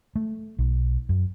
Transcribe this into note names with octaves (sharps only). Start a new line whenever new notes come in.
A3
B1
F#2